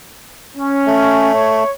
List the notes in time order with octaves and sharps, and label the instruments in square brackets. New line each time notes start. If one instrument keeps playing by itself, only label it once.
[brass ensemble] C#4
[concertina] A3
[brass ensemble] C#5